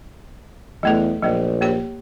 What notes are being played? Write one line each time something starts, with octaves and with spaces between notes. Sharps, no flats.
E2 F#3 A3 A4
A#1 F#3 A#3
A#3 G4 C#5